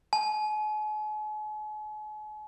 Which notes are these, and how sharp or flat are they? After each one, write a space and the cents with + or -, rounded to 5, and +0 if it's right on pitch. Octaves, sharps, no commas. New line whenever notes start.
G#5 +45